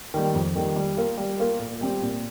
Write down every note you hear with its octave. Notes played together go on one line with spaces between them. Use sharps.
D#3 G3 A#3
F2
D#3 G3 A#3
G3
A#3 F4 A#4
G3
A#3 F4 A#4
A#2
G3 C4 G4
A#2